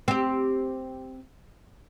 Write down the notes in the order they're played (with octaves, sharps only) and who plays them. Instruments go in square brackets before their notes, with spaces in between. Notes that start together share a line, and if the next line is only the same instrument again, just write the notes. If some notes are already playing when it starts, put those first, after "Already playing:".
[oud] C4 G4